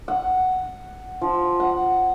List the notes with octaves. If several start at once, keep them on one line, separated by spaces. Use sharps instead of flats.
F#5
F3
F#5